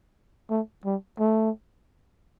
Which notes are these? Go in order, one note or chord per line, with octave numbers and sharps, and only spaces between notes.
A3
G3
A3